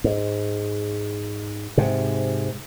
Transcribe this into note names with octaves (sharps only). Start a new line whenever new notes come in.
G#2
G#2 C3